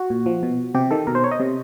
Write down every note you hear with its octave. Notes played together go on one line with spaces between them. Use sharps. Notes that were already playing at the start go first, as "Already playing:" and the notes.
Already playing: F#4
A#2
F3
B2
C3 G4
D#3 A4
B2 A#4
C5
C#5
D#5
C3